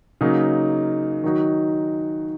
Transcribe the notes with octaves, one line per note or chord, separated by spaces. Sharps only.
C#3 F#3 A#3 D#4
D#3 F#3 D#4 F#4